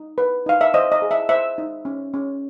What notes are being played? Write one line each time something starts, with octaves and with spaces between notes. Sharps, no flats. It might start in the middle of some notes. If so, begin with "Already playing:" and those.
Already playing: D#4
B4
D#4 F5
E5
C5 D#5
D#5
G#4
E5
C5 E5
D#4
C#4
C#4